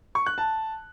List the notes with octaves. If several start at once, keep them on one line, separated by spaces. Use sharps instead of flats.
C#6
F#6
A5